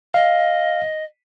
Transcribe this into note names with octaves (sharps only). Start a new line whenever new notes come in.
D#5 F5